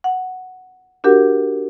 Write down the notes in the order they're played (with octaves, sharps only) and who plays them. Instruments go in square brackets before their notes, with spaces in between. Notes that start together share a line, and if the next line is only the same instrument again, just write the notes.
[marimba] F#5
D4 F#4 G4 A#4 F#5